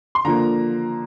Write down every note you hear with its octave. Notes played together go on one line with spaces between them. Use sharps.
C6
D3 F3 A#3 A#5